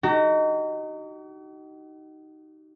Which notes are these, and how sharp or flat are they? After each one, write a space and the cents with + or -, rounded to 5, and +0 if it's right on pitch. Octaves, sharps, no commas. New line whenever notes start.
D#4 +0 F#4 +45 A#5 -20